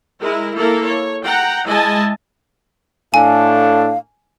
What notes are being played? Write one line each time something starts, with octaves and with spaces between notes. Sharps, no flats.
G#3 E4 A#4
A#3 E4 A4 A#4
C#5
F#5 G5 A#5
G#3 E4 D#5 G#5 A5
A2 D4 A4 F5 G#5